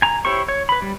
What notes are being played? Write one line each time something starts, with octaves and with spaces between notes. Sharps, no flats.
G#5 A#5
E4 G4 C5 C#5 C#6
C#5
B4 B5
G3